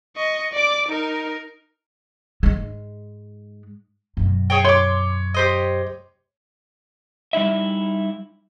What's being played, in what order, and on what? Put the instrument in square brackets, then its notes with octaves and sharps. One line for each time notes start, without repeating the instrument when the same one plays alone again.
[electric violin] D#5 C#6
D5 D6
D#4 A#4
[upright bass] G#2 G#3
F#2 B2
[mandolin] G#4 C#5 G5
[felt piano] C#5 [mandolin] C6 D6
[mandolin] G4 C5 D#5
[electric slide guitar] G3 D#4 E4 E5